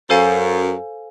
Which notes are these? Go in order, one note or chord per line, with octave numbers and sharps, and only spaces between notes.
F#2 A4 C5 F5 G#5